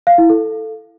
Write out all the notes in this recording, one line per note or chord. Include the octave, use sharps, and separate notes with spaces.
F5
E4
A4